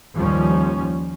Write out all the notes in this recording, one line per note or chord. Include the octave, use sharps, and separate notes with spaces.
D#2 F3 G3 C#4